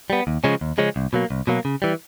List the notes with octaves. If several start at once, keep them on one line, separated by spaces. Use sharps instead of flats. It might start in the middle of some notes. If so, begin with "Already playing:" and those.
G3 B3
D#2
C#3 F3 G#3 C#4
D#2
C#3 F3 G#3 C#4
C2
B2 F#3 A#3
C2
B2 F#3 A#3
C#3
E3 G3